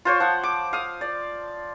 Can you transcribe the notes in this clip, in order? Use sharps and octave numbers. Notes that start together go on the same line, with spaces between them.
F4 C5 C#5
F3 F#5
D6
F5 D#6
D5